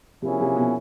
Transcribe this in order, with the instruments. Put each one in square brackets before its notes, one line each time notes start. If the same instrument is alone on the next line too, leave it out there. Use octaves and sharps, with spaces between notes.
[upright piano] C3 [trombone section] F3 A#3 C#4 E4 G#4
[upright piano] C3
B2